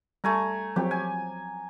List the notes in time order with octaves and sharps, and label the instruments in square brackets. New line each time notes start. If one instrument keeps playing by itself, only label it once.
[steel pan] G3 [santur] A3 G#5 A#5
[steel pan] F3 F#3 C4 [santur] G4
[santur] G#5